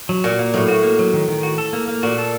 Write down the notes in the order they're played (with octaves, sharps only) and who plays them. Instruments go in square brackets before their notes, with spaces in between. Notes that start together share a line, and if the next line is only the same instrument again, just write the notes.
[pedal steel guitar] F#3
[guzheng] A#2 [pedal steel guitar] F#4
[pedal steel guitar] A#3
[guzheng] A2 [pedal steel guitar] F#3
[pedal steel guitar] F#4
A#3
F#3
D#3
D#3
F#4
A4
A#3
A#3
[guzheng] A#2 [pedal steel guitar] F#4
[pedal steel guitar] A4